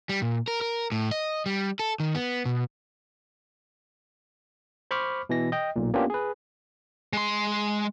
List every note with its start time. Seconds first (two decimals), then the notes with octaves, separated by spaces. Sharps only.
0.09 G3
0.22 A#2
0.48 A#4
0.61 A#4
0.92 A2
1.11 D#5
1.46 G3
1.79 A4
2.00 D#3
2.15 B3
2.45 B2
4.91 C5 B5 C#6 D6 F6
5.29 B2 E3 A#6
5.52 D#5 G5
5.76 B1 A#2
5.94 A#3 B3 C#4 D4 F4 G4
6.10 G#4 B4
7.13 G#3 C6